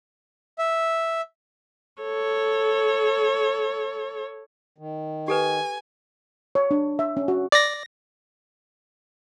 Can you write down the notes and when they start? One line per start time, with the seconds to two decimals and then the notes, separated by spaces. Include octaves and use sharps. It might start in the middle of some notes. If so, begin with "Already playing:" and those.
0.58 E5
2.02 A4 C#5
4.78 D#3
5.28 G4 A4 B4 G#5
6.55 C#5
6.71 D4
6.99 E5
7.17 C#4
7.28 F#4
7.52 D5 A#6